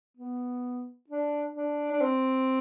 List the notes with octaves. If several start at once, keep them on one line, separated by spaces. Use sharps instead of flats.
B3
D4
D4
D4
C4